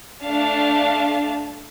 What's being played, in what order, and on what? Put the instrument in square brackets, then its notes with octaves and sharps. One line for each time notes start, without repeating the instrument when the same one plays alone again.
[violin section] A3 D4 F5 A5